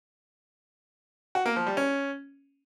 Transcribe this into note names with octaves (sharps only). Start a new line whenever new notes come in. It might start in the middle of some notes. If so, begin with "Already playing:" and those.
F#4
A#3
F3
G3
C#4